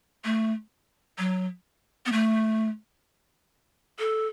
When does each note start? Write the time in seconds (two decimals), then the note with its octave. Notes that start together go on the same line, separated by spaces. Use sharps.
0.25 A3
1.18 F#3
2.06 B3
2.12 A3
3.99 A4